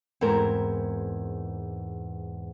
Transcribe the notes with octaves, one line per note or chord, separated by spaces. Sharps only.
E2 G#2 C4 A#4